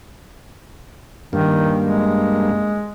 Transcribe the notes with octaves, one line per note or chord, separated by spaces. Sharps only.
G2 D#3 A#3
G#3